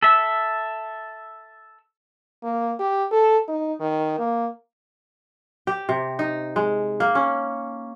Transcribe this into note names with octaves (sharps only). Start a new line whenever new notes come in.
A4 E5
A#3
G4
A4
D#4
D#3
A#3
G4
C3
D#4
G#3
A#3
C#4